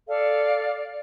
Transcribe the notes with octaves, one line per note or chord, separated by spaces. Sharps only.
A4 D5 F5